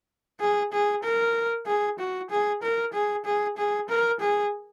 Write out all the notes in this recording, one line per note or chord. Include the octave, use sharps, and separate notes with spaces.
G#4
G#4
A#4
G#4
F#4
G#4
A#4
G#4
G#4
G#4
A#4
G#4